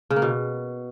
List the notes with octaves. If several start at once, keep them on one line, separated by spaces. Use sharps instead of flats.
C#3
A#3
B2